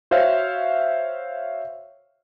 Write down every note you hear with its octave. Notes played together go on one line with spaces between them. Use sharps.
F#4 C5 C#5 E5 F5